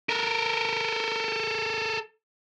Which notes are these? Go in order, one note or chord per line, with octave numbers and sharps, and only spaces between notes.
A4 A#4